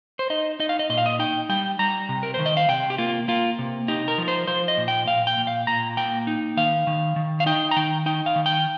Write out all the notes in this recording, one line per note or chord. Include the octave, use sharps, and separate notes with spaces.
C5
D#4 D#5
D#4 D#5
F5
D#5
A#2 D#5
F5
D#5
D#4 G5
G3 G5
G3 A#5
C3
A#4
D#3 C5
D#5
F5
C3 G5
G4
A#3 F4
A#3 F4
C3
D#4 G4
A#4
F3
C5
F3 C5
D#5
A#2
G5
A#2 F5
G5
A#2
F5
A#2 A#5
A#3 G5
D#4
D#3 F5
D#3
D#3
F5
D#4 G5
A#5
D#3 G5
D#4 G5
F5
D#3
G5